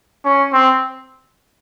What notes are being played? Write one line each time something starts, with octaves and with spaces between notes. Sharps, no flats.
C#4
C4